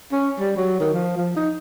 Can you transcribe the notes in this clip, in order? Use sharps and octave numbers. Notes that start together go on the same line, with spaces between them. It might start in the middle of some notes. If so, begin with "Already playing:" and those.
C#4
G3
F#3
D#3
F3
F3
D#4